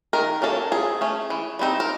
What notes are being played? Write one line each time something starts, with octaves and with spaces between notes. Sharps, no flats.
D#3 A#4
F#3 A#3 C#4 A4
F3 G#4
A3 C#4
E3
G3 C4 D#4
A#4